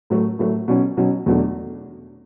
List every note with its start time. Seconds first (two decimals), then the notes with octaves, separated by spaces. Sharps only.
0.10 A2 F#3 A3
0.39 A2 F#3 A3
0.68 B2 F#3 C#4
0.97 B2 F#3 C#4
1.26 E2 B2 F#3 A3 D4